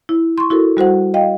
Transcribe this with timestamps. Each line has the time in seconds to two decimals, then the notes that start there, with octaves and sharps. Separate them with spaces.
0.09 E4
0.38 C6 C#6
0.50 E4 F#4 A4 A#4
0.77 G3 F#4 C5 F#5
1.14 D#5 F5 G5